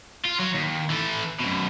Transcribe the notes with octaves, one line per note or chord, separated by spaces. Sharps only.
F4
F#3
D#2
E3 A4
F#2 B2